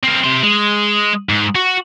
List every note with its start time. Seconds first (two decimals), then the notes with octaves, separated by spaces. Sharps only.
0.03 C4 A#4
0.24 C3 C5
0.43 G#3
1.29 G#2
1.55 F#4